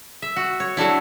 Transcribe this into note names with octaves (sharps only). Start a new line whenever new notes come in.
E5
F#4
C#5
F#3 A3 D4 E4